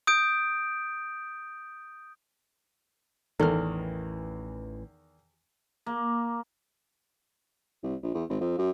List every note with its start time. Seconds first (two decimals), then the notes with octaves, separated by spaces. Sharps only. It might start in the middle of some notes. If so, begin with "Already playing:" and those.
0.07 D#6 G6 D7
3.40 A1 E2 D#3 E3 A4 F6
5.86 A#3
7.83 C2
8.03 A#1
8.15 E2
8.29 G#1
8.41 F2
8.58 F#2